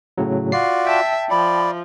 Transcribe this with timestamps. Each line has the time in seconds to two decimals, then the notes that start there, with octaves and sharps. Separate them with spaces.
0.18 A2 C#3 F#3
0.52 F4 F#4 D5 C7
0.87 E5 G5 A5
1.30 F3 D5 B5